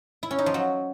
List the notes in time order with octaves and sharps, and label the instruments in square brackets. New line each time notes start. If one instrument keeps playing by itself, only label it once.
[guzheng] E4
C#4
D#4
F3
F#3